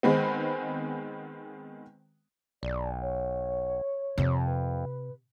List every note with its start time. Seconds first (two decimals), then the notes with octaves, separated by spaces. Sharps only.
0.03 D#3 G#3 B3 C4
2.63 B1 D5
3.01 C#5
4.18 F2 C3
4.46 B4